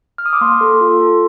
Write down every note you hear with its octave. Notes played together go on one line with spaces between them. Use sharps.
F6
D#6
D6
A#3 C6
A4
F4
A4